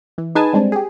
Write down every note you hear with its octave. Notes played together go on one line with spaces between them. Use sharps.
E3
D#4 G#4 B4 G#5 A5
G3 G#3 C4 D4
G4 G#4